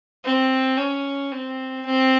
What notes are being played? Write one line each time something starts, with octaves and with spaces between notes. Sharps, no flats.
C4
C#4
C4
C4